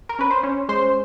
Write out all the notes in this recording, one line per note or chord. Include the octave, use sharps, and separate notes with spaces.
A#4
C#4 B4
C5
C#4
G#3 C5